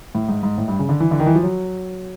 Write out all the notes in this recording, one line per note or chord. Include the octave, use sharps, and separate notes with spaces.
A2
G#2
G#2
A2
G2
C#3
D3
E3
D3
D#3
E3
F3
F#3